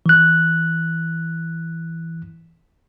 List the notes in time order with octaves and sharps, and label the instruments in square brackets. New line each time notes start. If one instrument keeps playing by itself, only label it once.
[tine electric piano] E3 F#6